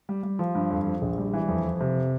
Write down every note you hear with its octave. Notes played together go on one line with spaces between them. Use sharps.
G3
G3
F3
G2
F2
F3
A#1
G3
E3
F2
F2
C3